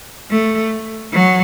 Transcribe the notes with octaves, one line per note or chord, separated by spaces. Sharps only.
A3
F#3